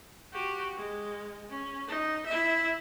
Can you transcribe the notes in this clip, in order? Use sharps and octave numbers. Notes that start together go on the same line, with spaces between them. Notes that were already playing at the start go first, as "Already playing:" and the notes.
F#4 G4
G#3
C#4
D#4
E4 E5